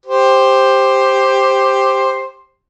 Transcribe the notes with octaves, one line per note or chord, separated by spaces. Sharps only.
G4 C5